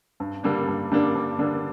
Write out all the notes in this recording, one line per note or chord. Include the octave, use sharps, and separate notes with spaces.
G2
D3 G3 A#3 D4
G2
D3 G3 A#3 D4
G2
D3 G3 A#3 D4